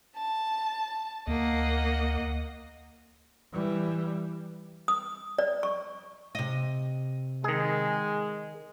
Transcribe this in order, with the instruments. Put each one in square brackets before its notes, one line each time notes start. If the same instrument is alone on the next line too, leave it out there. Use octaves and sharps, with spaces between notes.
[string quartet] A5
[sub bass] D2 [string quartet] A#3 D#5 F#5
[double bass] E3 G3
[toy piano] D#6
D5
C#6
[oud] C3 D#5
[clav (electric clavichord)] D#3 G#4 [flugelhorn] G#3